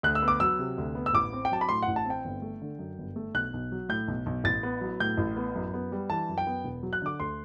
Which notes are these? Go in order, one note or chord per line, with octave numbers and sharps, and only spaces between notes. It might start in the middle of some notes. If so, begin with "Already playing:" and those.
D2 F#6
E6
B3
D6
F#3 E6
C3
D2
B3
E6
A1 D6
C4
G5
F#3 A5
B5
A2 C6
F#5
A1
A5
C4 G5
G1
A3
D3
F#2
G1
A3
B1 F#6
B1
F#3
A2 G6
B1
B1
A1 A6
B3
F#3
A2 G6
A1
B3
F#2
B3
G3
E3 A5
F#2
G5
B3
E1
F#3
F#6
D3 D6
D2 C6